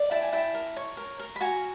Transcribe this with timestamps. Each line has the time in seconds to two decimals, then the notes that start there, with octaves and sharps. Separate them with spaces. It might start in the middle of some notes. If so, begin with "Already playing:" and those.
Already playing: D5
0.11 E4 G5 A5
0.22 G#5
0.33 E4 G5 A5
0.54 A#4
0.76 C#5
0.97 A#4
1.20 A#4
1.36 B5
1.41 F#4 G#5 A#5